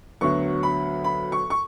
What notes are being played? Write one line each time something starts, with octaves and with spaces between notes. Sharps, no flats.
D2 D3 F#3 B3 C#6
B5
B5
C#6
C#6